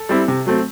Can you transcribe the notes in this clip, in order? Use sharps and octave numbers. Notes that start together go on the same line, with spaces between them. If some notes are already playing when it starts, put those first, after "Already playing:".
Already playing: A4
G3 C4 E4
C3
F#3 A3 C4